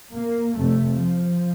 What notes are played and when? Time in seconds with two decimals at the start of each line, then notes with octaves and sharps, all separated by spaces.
0.14 A#3
0.56 F2 C3 A3
0.98 F3